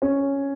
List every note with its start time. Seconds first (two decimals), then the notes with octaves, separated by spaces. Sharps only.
0.02 C#4